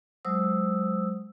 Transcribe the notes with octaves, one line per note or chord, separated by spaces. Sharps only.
F#3 G#3 C5 D#6 E6